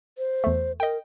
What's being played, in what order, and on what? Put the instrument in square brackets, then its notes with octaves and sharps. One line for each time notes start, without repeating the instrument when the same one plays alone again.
[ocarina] C5
[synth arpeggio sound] E2 A3
[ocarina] A#4 [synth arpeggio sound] D#5 G5